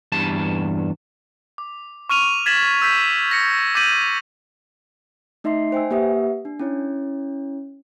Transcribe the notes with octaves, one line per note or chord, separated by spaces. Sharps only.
E2 G2 A5
D6
C#6 F6 D#7 F7
G#6 A6 B6 E7 F#7
E6 G6 B6
A#6 C#7
D6 G6 A6 B6 D#7 F#7
A3 D#4 D#5 E5 C6 C7
C5 G5 G#5 E6
A#3 G4 B4 E5 F#5 D#6
D4
C#4 E4 C#5